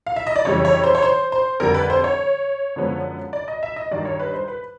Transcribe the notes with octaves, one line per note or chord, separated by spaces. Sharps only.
F5
E5
D#5
D5
F2 C#3 E3 G3 C#5
C#5
C5
C#5
C5
C5
F2 D3 G3 A#4
B4
C5
C#5
F#2 D3 F3 G#3 B3
D5
D#5
E5
D#5
G2 D#3 G3 D5
C#5
B4
C5
B4